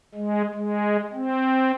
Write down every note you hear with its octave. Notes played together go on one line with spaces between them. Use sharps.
G#3
G#3
C4